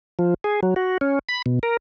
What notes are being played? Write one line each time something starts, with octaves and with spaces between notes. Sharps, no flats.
F3
G#4
F#3
F#4
C#4
B5
B2
A#4